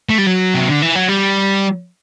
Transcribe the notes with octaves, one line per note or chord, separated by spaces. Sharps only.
A3
G3
F#3
C3
D3
E3
F#3
G3